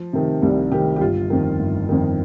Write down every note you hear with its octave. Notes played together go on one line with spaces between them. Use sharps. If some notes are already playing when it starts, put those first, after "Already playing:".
Already playing: F3
C3 D#3
C2 G3
C3 D#3 G4
G4
G1 F4
F2 D#3
G1
F2 D#3